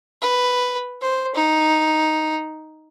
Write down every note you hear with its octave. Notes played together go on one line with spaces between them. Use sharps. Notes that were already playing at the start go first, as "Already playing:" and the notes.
B4
C5
D#4